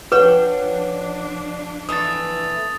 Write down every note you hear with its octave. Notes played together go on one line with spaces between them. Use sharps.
F3 D4 B4 C#5 F#5 G5
E3 A3 B3 D#6 A6